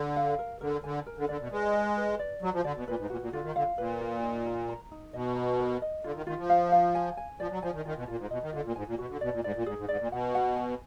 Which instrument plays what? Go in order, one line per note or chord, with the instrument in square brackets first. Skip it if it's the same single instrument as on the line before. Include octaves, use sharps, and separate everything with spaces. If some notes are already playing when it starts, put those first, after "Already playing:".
Already playing: [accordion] D3
[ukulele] F5
A#4
[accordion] D3 [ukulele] A#4
[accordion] D3 [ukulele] G#5
[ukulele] A#4
[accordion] D3
[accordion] D3 [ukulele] D5
[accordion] B2
[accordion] G#3 [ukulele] B4
[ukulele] G#5
B4
D5
[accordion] F#3 [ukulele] F#4
[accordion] F3
[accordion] D3 [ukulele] D5
[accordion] B2
[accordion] A#2 [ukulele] B4
[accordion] G#2
[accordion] A#2 [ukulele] F#4
[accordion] A#2
[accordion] D3 [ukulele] F4
[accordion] D#3
[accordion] D3 [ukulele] F5
[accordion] A#2 [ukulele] B4
[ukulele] F4
D#4
A#4
A#5
D#4
[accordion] B2 [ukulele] D#5
[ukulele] A#5
A#4
D#5
[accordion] D3 [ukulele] F4
[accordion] D#3
[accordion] D#3 [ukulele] F4
[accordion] F3
[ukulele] F5
F5
G#5
G#5
[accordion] F3 [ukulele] D5
[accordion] F#3
[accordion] F3 [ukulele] G#5
[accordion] D#3
[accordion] D#3 [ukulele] F4
[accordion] B2
[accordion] A#2 [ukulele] F4
[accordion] G#2
[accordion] B2 [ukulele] D#5
[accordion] D#3
[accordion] D3 [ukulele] F4
[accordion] A#2
[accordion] G#2 [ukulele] G#5
[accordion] A#2
[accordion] B2 [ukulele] F#4
[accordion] D3
[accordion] B2 [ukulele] D5
[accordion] A#2
[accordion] G#2 [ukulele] D5
[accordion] A#2
[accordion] G#2 [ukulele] G#4
[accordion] G#2
[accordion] G#2 [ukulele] D5
[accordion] A#2
[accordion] B2 [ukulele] F#5
[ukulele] F#5
G#5